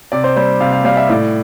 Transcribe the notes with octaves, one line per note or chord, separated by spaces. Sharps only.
C3 D5
C5
G3 C5
C3 F5
F5
G3 F5
E5
A2 D5